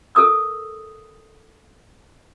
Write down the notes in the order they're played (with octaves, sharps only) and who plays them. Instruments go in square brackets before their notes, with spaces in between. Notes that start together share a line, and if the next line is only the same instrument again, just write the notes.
[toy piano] A4 A#4 D#6 E6